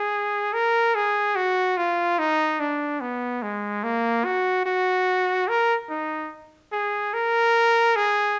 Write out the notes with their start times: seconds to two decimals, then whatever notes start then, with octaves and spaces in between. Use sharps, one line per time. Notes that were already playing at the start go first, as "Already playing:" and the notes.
Already playing: G#4
0.53 A#4
0.95 G#4
1.36 F#4
1.77 F4
2.19 D#4
2.60 D4
3.01 B3
3.42 G#3
3.84 A#3
4.25 F#4
4.66 F#4
5.48 A#4
5.89 D#4
6.72 G#4
7.14 A#4
7.96 G#4